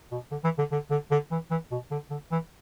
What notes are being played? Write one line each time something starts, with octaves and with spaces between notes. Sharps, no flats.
B2
D3
E3
D3
D3
D3
D3
E3
E3
B2
D3
D3
E3